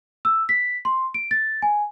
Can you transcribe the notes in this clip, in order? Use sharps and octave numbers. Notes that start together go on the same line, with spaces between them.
E6
B6
C6
D7
A6
G#5